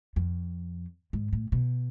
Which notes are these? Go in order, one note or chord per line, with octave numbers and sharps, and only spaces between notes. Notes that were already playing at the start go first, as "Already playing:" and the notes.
F2
G#2
A2
B2